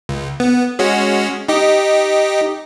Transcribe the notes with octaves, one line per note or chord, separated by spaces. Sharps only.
C#2
B3
G#3 C#4 F#4
D#4 G4 D#5